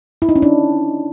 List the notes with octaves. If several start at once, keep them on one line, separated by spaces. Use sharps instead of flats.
E4
D#4
C#4
D4